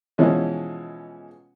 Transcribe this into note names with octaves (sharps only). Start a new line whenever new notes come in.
B2 E3 F3 G#3 C#4